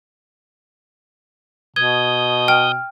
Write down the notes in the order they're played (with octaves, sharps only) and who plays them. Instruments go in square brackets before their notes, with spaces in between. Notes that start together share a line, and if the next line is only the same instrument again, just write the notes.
[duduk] B2 [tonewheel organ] D#6 G6 [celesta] G#6
[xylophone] G5 [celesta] F6